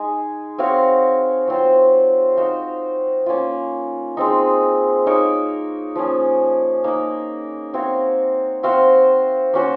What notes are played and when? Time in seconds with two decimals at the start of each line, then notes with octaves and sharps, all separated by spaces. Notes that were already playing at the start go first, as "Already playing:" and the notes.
Already playing: G#3 D#4 G#4
0.58 C4 F#4 C#5 F5
1.48 F#3 C4 F4 C5
2.37 D#4 F#4 C5 F5
3.26 A#3 C#4 F4
4.17 G#3 C4 D#4
5.07 A#3 D#4 A#4 C#5
5.95 F3 A#3 C#4
6.84 A#3 D#4 A#4
7.74 C4 F#4 C#5 F5
8.63 C4 F#4 C5 F5
9.54 A#3 C#4 F#4 C5